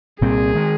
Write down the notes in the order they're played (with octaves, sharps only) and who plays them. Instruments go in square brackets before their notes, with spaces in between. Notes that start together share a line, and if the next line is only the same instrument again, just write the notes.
[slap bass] C2 A#2 G3 C4 [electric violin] G#4
[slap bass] D#3 G#3